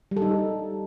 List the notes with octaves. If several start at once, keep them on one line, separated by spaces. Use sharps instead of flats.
G3
A4
D#4